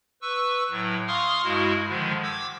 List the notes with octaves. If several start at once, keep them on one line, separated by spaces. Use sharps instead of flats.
B4 C#6 E6
A2 F#3
F5 C6 C#6 D#6 F6
G2 G#3 E4 F#4
D3 D#3 F3 G#3
D6 E6 G#6